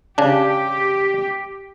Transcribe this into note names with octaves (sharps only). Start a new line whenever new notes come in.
C#3 D4 G4